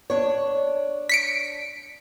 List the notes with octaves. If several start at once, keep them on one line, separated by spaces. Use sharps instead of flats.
D4 C#5
B6 C#7 D7